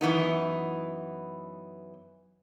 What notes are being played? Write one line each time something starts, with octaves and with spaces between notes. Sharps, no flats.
F#2 E3 B3 D#4